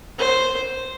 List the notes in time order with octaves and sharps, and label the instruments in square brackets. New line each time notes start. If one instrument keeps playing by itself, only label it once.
[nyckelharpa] C5